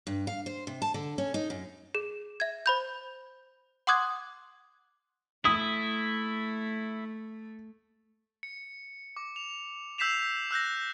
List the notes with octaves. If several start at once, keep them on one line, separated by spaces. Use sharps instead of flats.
G2
F5
C5
C3
A5
D3
C#4
D#4
F#2
G#4
E5 G#6
C5 B5 G6
F#5 C6 D6 D#6 F#6 G#6
A3 E4 D#6
C#7
D6
F7
E6 G6 B6 C7 E7 F7
E6 F#6 G6 A#6